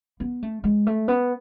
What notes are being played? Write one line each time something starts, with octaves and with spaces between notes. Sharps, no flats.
B3
A3
G#3
A3
B3